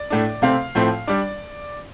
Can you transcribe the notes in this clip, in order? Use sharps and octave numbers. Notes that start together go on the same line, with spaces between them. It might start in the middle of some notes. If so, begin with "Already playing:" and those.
Already playing: D5
A2 A3 D4
C3 A3 C4 F5
A2 F3 A3 C4
G3 D4 D5